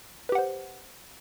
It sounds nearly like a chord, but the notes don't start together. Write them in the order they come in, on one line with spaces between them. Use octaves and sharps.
B4 G4 F#5 C5